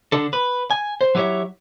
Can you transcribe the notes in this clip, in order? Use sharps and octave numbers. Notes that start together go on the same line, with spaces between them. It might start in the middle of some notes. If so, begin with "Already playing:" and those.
D3 D4 A4
B4
G#5
C5
F#3 E4 G4 G#4 C#5 E5